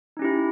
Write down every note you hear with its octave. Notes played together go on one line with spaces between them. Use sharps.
C#4 D#4 E4 G4